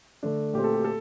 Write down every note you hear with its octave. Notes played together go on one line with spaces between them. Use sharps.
D3 A3 D4
A#2 A3 C4 G4
A4
G4
A4